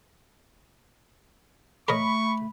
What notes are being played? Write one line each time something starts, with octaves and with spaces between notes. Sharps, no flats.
A3 A#4 C#5 D#5 B5 C#6